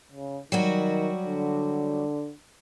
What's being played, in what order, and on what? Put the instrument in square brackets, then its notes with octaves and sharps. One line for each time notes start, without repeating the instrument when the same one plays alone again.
[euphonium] C#3
[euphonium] D#3 [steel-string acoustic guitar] F#3 G3 F#4
[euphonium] D3